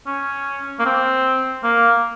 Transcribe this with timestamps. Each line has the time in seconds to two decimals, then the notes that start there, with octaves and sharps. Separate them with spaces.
0.07 C#4
0.80 A#3
0.86 C4
1.64 A#3